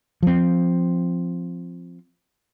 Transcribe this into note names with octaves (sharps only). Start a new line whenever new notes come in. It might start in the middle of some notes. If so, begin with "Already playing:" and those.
F3 C4